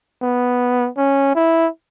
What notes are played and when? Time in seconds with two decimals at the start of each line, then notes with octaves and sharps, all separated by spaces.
0.22 B3
0.97 C#4
1.35 E4